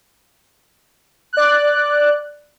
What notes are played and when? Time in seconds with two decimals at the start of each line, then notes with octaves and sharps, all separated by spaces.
1.33 D5 F#6